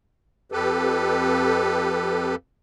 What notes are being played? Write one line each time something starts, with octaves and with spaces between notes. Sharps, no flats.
F2 G4 A4 B4